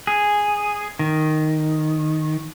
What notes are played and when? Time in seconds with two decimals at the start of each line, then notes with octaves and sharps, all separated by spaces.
0.07 G#4
0.99 D#3